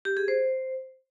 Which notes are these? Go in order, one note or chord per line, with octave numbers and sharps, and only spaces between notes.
G4
G#4
C5